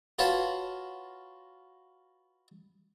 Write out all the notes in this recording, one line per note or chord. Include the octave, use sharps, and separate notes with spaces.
F4 F#4 B4 C#5 F5 A5